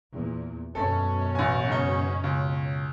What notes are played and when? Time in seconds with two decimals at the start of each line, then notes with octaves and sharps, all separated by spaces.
0.12 E2 A#2
0.75 F#2 B2 C#4 A4
1.35 A1 G#5
1.68 G#2 C#3 D#4
2.24 C#2